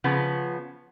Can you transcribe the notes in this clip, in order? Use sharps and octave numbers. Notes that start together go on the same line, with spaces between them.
C#3 F3 B3